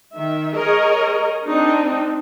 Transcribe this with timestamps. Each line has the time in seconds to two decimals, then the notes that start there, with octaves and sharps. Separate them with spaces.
0.15 D#3 E5
0.55 G#4 A#4 C#5 D#5
1.48 C4 D4 D#4